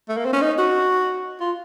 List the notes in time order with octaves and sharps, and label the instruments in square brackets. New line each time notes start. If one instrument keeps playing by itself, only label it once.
[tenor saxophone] A3
A#3
C4
C#4
D#4
F#4
F4